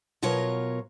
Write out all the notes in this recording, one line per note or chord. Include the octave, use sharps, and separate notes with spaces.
B2 F#3 F4 A#4 C#5 A#5